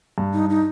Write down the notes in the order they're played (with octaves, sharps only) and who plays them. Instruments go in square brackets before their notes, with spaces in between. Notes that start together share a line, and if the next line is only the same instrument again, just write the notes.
[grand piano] G2
[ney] D#4
D#4